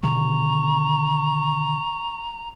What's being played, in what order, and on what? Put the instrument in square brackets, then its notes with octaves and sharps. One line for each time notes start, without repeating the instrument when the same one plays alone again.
[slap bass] B2 D3 D#3 [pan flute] A#5 [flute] C#6